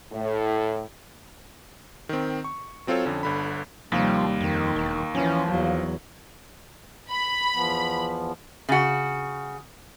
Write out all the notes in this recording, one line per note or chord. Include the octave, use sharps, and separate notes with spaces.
A2
D#3 C4
C#6
F#3 C4 F4 A4 C#5
F2 D3 C#4
G1 D3 B5
D#2 C3 F3 G3
F2 D#3
E1
E3 F3 C#4
E2 F#3
B5
E2 F3 B3
C#3 F#4